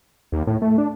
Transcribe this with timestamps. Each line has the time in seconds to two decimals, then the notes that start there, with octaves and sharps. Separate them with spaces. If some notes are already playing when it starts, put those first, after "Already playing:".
0.32 D#2
0.47 A2
0.62 A3
0.78 D4